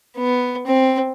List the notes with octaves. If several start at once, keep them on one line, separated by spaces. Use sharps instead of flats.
B3
C4